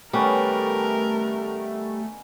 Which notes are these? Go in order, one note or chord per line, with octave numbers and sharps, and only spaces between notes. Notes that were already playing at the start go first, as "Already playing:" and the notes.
D#3 G3 A3 B3 C#4 A#4